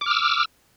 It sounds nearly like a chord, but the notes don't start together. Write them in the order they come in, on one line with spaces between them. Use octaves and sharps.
D6 F6 E6